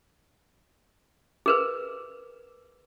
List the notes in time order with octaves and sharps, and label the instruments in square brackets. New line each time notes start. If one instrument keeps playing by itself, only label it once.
[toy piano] G#4 A#4 B4